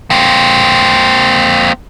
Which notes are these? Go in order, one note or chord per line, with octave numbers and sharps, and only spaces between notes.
A#3 C4